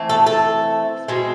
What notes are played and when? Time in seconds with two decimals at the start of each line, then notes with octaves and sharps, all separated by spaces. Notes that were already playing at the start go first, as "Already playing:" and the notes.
Already playing: E3 A3 C4
0.09 A4
0.26 A4
1.08 B2 G#3 C4